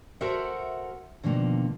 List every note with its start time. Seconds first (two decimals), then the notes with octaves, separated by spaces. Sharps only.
0.21 F#4 A4 A#4 C5 E5 F#5
1.24 B2 D3 D#3 F3 A#3